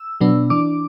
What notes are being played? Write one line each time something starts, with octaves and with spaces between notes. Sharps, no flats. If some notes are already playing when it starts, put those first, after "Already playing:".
Already playing: E6
B2 F#3 B3 D4
E3 D4 D6